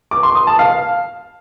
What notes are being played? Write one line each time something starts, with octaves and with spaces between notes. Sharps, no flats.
D6
C6
D#6
A5
F5